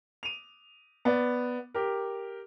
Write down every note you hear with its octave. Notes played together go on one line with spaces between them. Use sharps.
D#7 F7
B3 D5
G4 A#4